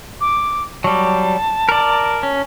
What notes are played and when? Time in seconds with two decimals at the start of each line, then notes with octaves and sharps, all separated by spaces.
0.21 D6
0.84 F#3 G3 A5
1.69 A#4 D5
2.23 C#4